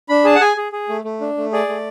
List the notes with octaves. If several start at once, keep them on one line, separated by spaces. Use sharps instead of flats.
D4 B5
G#4 A5
F#5
G#4 G#5
G#4
G#4
A3
A3
D4
A3
G#4 D5
A3